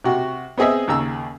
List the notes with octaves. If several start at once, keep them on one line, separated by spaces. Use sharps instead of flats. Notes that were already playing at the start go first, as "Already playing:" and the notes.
C3 F#4
B3 C4 G#4 D#5 E5
D#2 C#3 A#5 E6